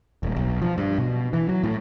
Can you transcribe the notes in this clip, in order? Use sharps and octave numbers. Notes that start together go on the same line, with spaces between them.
D#1
B1
F3
G2
B2
E3
F#3
A2